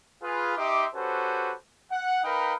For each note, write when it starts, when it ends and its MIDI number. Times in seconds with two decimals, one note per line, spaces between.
0.22 0.55 65
0.22 0.55 68
0.22 0.55 71
0.57 0.85 63
0.57 0.85 67
0.57 0.85 76
0.57 0.85 84
0.57 0.85 86
0.94 1.53 61
0.94 1.53 66
0.94 1.53 67
0.94 1.53 69
0.94 1.53 71
0.94 1.53 72
1.91 2.23 78
2.24 2.54 63
2.24 2.54 70
2.24 2.54 71
2.24 2.54 77
2.24 2.54 79
2.24 2.54 83